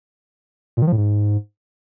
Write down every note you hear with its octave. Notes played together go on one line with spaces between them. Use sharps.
A#2
D#3
F3
A2
G#2